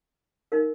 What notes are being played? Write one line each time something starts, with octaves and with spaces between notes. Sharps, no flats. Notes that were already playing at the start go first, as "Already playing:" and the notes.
D#4 A#4 F5